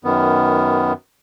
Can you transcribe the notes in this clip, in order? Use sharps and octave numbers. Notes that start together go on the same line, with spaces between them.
F#2 D#3 B3